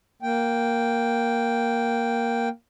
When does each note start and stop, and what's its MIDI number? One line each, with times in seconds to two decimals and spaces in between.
0.22 2.49 58
0.22 2.49 79